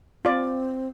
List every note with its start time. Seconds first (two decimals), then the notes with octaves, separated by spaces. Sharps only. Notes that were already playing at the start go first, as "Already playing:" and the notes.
0.25 C4 F4 D5